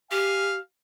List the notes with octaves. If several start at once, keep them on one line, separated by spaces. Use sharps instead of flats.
G4 F5 G#5